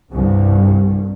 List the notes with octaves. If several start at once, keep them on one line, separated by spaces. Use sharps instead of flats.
G1 C2 G2